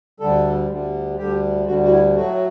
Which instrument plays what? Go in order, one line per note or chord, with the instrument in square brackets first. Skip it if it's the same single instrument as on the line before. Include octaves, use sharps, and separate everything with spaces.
[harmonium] D2 D3 G3 A4
D2 D3 G3
D2 D3 G3 G4
D2 D3 G3 F#4
F#4
E4
A2 F#3 A3 F#4